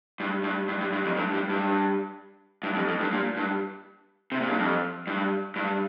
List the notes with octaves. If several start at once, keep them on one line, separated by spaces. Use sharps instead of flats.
G2
G2
G2
G2
G2
F2
G2
G2
G2
G2
F2
F2
G2
A#2
G2
C3
A#2
G2
F2
G2
G2